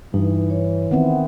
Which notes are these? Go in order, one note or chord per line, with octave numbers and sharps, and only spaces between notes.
G2 E3 D#4
C#5
D#3 B3 C4 E5 F#5